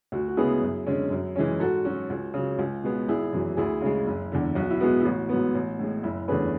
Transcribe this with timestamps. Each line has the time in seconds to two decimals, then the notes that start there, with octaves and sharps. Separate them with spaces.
0.12 D2 F#4
0.28 F#4
0.37 C#3 G#3 B3 E4 G#4
0.62 F#2
0.86 D3 G#3 C#4
1.11 F#2
1.36 E3 G#3 C#4
1.60 G#2 F#4 A4
1.85 F#3 C#4 F#4
2.10 C#2
2.34 C#3 F#3
2.59 C#2
2.83 B2 G#3 B3
3.08 G#1 E4 G#4
3.33 F#2 E3
3.57 D2 E4 G#4
3.82 C#3 G#3
4.07 F#1
4.32 E2 D3
4.55 B1 F#4
4.70 E4
4.80 B2 G#3 B3 F#4
5.00 E4
5.05 A1 F#4
5.29 G#2 F#3 B3
5.55 A1
5.79 A2 G#3
6.03 F#1 E4
6.28 E2 D3 A3 C#4 G#4 B4